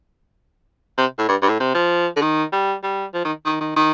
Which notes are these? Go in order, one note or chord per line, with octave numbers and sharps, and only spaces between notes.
C3
A2
G2
G2
A2
C3
F3
D3
D#3
G3
G3
F3
D#3
D#3
D#3
D#3